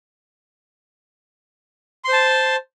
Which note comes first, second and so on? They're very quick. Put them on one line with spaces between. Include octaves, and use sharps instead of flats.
C6 C5 A5